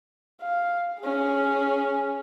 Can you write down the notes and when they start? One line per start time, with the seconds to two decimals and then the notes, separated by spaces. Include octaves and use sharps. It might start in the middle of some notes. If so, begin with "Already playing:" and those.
0.41 F5
1.00 C#4 G#4